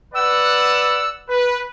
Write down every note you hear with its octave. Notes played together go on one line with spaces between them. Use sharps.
B4 D5 F#5 E6
B4